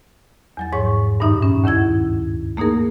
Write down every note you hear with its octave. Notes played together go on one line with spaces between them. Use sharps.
E2 F#3 A6
G#2 F3 C#5 C#6
G2 A#2 D#3 D#4 E5 A#5
C#4
D2 D#3 C#4 E4 G#6
A3 A#3 D#4 G#4 A#4